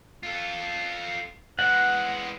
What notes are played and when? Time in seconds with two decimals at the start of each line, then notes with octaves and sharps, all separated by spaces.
0.23 F4 A4
1.59 E3 G#3 F#5